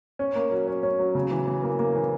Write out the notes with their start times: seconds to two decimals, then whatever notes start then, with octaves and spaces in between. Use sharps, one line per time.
0.19 C#4
0.35 A#3
0.51 F#3
0.67 C#4
0.83 C#4
0.99 F#3
1.15 C#3
1.31 E3
1.47 E3
1.63 A#3
1.79 A#3
1.95 E3